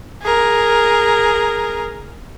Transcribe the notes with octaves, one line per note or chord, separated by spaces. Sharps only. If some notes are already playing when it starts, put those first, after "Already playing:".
G#4 A#4